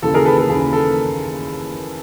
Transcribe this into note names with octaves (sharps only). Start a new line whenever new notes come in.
D#2 C#3 E3 A4
G#4 A#4
A4 B4
A4
D#2 C#3 E3 G#4
A4